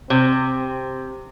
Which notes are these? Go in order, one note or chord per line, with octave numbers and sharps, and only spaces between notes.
C3 C4